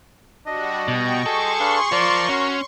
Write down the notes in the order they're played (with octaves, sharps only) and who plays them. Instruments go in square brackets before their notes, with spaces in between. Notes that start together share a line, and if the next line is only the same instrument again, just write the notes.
[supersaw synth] G3 F#4 [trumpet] D4 [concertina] D#5
[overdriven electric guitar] B2 [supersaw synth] G5 C#6
[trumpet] G#4 [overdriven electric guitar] A4 [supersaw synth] C6 C#6
[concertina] D4 B4 F5
[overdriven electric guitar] F4 C5 [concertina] A#4 [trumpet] D5
[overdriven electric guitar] C#4 [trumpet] F#4